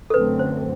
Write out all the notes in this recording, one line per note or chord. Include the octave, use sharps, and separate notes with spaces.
A4
F#2 D3 A3 C4 B4
C5